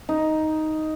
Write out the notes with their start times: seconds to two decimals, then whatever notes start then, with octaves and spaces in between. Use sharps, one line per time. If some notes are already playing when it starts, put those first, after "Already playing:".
0.09 D#4